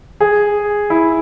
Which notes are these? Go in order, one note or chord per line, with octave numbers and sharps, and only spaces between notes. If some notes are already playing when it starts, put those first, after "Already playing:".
G#4
E4